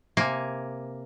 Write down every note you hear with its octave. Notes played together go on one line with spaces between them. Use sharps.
C3 A#3 G#5